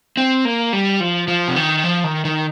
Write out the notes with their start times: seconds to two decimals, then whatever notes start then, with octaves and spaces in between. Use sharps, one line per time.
0.17 C4
0.45 A#3
0.73 G3
1.00 F3
1.28 F3
1.48 C3
1.56 D#3
1.84 F3
2.04 D#3
2.25 D#3